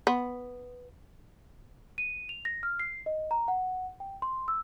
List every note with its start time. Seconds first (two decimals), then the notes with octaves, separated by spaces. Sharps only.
0.07 B3
1.98 D#7
2.29 F7
2.45 A#6
2.63 F6
2.79 C7
3.06 D#5
3.31 A#5
3.48 F#5
4.00 G5
4.22 C6
4.48 E6